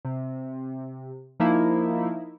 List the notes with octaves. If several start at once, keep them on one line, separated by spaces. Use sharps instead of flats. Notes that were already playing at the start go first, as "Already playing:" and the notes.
C3
F3 A#3 D#4 E4